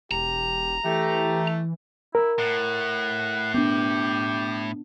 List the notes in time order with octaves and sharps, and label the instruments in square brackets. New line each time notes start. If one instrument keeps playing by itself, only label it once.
[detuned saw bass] E1 [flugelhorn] G4 [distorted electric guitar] A#5
[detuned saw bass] E3 [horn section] A3 [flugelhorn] G4
[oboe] E4 [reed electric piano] A#4
[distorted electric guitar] A2 [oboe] F#5
[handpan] B3 D4 [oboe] G4